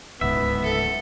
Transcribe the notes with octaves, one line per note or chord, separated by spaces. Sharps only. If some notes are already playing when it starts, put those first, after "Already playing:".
D1 C#2 G#2 B3 E5
A4